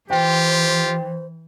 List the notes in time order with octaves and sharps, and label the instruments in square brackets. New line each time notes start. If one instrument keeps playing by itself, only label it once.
[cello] E3 [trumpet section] F4 G4 [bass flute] C5 [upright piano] G5